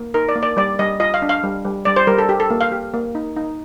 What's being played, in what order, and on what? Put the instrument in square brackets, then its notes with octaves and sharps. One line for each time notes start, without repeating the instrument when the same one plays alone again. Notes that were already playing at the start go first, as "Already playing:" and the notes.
Already playing: [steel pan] A#3
D#4 A#4
D5
A#3
D5
G3 D5
G3 D#5
F4 D#5
F5
D4
F5
G3
G3
G3 D5
C5
G3 A#4
A4
G4
A4
A#3
F5
G4
A#3
D#4
D#4